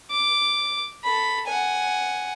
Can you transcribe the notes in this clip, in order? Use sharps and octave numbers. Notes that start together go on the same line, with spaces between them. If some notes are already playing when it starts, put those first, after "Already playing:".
D6
A4 B5
F#5 G#5